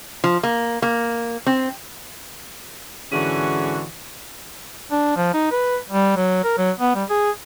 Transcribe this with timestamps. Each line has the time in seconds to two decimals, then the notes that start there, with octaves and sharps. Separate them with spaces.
0.24 F3
0.43 A#3
0.82 A#3
1.46 C4
3.12 G#2 D3 E3 C#4 F#4 G#4
4.92 D4
5.16 F3
5.34 D#4
5.51 B4
5.90 G3
6.16 F#3
6.44 A#4
6.58 F#3
6.80 B3
6.95 G3
7.10 G#4